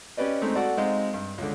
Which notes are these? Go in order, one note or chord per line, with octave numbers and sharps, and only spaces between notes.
C#4 G4 B4 D5 D#5
G#3 A3 C4 D#4
F#4 A4 D5 F#5
G#3 C4 D#4 D#5 F5
G2
C#2 D3